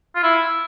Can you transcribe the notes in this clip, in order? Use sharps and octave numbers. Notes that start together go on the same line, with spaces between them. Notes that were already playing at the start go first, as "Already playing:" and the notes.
F4
E4